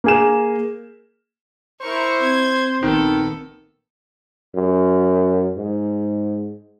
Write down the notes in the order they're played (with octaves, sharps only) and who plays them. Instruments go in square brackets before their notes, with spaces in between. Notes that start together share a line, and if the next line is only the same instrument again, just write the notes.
[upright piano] A#3 G#4 E7
[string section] E4 A#4 C#6 [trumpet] C5
[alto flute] C4 [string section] G#6
[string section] A#1 B3 A4 [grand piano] D#3
[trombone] F#2
G#2